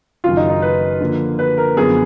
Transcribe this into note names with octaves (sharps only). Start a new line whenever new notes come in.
F#1 F#2 D#3 F#3 F4
D#4
D#4
B4
D3 F3 A#3
B4
A#4
F#2 D3 F3 B3 G#4